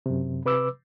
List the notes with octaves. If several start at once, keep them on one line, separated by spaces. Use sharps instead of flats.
F#2 C3
C3 B4 D6 E6